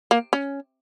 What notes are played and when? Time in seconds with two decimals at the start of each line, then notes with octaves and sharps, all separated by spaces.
0.11 A#3
0.33 C#4